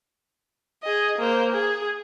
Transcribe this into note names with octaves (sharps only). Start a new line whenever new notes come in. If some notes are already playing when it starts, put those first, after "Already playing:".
G#4 D#5
A#3 C5
G#4